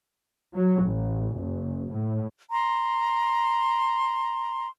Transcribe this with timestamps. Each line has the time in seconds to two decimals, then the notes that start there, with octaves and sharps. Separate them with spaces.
0.55 F#3
0.84 A1
1.38 F#1
1.93 A2
2.51 A#5 C6